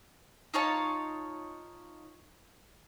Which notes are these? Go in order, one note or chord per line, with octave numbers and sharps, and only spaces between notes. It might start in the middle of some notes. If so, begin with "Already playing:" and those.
D#4 F4 C#5 A5